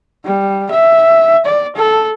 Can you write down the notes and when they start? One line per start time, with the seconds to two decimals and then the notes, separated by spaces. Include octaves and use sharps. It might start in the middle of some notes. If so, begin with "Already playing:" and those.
0.25 G3
0.71 E5
1.45 D5
1.76 A4